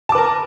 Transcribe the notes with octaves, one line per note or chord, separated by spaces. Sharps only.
A#4 B4 A5 D6